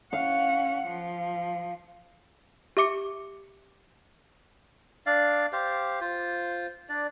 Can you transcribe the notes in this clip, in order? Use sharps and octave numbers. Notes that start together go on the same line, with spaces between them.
C#4 F5 F#5
F3
G4 E5 D6 C#7
D4 D5 F5
G4 C5 F5
F4 C5
D4 D5